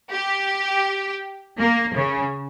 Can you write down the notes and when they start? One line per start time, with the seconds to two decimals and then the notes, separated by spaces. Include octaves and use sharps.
0.12 G4
1.58 A#3
1.95 C#3